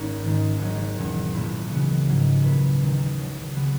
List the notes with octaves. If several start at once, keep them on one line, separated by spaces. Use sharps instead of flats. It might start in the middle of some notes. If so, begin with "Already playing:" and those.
Already playing: G#1 A#3 C#4
G#2 D#3 G#3
G#1 G#2 D#3 F#3 C#4
E2 B2 G#3 C#4
B1 A#2 A#3 E4
C#2 C#3 E3 B3 F#4
A#1 G#2 F#3 A#3
A#2 A#3 E4 G#4 B4
D#2 D#3 G#3 D#4
C#2 C#3 F#3
C#3 F#3 B3